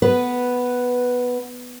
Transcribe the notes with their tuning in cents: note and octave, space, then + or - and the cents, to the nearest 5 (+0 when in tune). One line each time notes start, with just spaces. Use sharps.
B3 +0 B4 +0